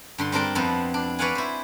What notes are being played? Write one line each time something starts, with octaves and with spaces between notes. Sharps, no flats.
G2 D3 C6
G3 C4 D4 A#4 G5
F2 B3 C4 E4 A5
D4
B4 C#5 D5 F5 F#5 G#5
E4 C5